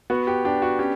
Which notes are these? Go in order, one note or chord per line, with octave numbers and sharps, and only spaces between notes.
B3 F#4
G4
D4 G4
F#4
C#4 G4